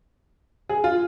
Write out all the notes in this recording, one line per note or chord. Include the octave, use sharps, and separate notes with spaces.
G#4
F4